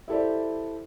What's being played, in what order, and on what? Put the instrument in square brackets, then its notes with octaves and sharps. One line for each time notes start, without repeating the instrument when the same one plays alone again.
[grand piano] E4 G4 A4 C5 D5